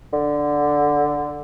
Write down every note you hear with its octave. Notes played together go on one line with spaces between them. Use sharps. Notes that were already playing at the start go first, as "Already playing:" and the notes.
D3